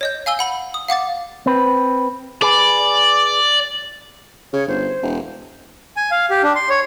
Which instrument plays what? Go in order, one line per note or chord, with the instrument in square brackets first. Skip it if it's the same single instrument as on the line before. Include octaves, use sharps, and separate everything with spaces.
[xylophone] C#5 D#5 G6
F5 G#5 E6 G7
F#5 B5 F#7
D#6
F5 F#5 D6 A6
[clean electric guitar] C4 B4
[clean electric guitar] G#4 B4 [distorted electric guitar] D5
[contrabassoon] C#3 [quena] C#5
[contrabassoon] G1 [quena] C5
[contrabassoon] E1
[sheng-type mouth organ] G#5
F5
G4
D4
C6
C#5